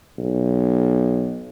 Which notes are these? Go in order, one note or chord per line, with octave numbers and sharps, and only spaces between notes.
B1